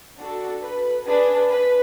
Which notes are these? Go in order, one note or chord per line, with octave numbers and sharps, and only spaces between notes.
D4 F#4 A4
B4
D4 G#4 B4
B4